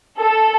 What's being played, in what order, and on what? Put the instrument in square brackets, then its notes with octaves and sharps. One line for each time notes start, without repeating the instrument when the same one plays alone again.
[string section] A4